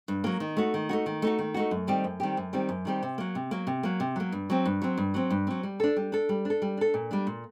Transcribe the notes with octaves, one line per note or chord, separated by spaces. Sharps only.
G2
F#3 A#3
D#3
A3 D#4 F#4
D#3
A3 D#4 F#4
D#3
A3 D#4 F#4
D#3
A3 D#4 F#4
F#2
D#3 G3 C4 G4
F#2
D#3 G3 C4 G4
F#2
D#3 G3 C4 G4
F#2
D#3 G3 C4 G4
C3
F#3 A#3
C3
F#3 A#3
C3
F#3 A#3
C3
F#3 A#3
G2
F#3 C4
G2
F#3 C4
G2
F#3 C4
G2
F#3 C4
G3
D4 A4
G3
D4 A4
G3
D4 A4
G3
D4 A4
A#2
G3 A#3 D4
A#2